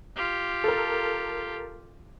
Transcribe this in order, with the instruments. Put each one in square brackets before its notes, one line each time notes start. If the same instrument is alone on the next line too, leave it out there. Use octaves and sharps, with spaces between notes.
[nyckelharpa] F4 G4
[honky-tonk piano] A4 A#4